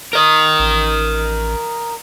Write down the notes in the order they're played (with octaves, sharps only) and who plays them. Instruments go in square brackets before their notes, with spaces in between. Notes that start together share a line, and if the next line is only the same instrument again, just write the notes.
[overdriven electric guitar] A#4 D#5
[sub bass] A1